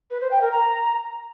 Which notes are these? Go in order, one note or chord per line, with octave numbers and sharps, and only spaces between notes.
B4
C5
G5
A#4
A#5